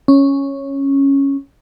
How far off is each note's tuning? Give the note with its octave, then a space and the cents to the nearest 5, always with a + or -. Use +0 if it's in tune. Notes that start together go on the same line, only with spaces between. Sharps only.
C#4 -5